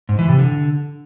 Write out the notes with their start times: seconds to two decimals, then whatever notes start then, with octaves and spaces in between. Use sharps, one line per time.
0.09 G#2
0.19 E3
0.29 C3
0.38 D3